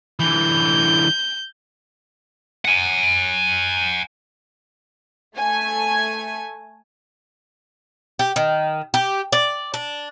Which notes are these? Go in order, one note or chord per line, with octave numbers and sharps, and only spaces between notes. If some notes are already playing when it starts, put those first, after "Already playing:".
D3 E3 G6
F#5 G#5
A3 G#5
G4
D#3
G4
D5
D4